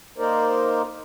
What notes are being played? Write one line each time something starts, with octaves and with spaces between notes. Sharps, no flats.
A#3 D#4 A#4 C5 D5